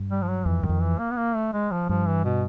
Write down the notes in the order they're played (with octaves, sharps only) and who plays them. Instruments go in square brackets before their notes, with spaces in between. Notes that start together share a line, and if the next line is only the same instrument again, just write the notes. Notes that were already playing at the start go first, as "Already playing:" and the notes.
Already playing: [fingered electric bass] G2
[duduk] G3
F3
F#3
[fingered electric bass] F2 [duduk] E3
[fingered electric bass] F#2 [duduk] D#3
[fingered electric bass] F2
[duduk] E3
A#3
B3
A#3
A3
G#3
F3
[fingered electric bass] G2 [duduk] F3
[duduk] E3
B2